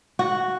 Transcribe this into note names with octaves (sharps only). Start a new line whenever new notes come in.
F#4